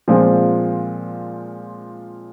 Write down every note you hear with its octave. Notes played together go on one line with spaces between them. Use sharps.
A#2 F3 G#3 C4